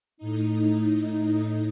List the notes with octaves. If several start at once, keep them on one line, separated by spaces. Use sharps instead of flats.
A2 D#4